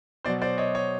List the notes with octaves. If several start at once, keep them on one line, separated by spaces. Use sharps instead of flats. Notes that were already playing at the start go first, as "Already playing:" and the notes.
B2 F#3 C5 D5
C5 D5
C#5 D#5
C#5 D#5